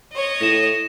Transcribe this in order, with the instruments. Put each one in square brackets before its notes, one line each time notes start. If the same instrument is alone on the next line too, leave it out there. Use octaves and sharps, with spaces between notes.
[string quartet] C#5 D#5
[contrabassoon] A2 [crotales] A#6 E7